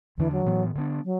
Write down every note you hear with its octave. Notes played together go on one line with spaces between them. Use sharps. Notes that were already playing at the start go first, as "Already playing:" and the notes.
E2 D3 E3 A3 D4
F#3
A2 E3 B3
D3 B3 D4
F#3